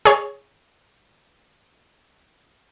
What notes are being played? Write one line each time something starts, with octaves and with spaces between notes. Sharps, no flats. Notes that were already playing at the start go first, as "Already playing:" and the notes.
G#4 C#5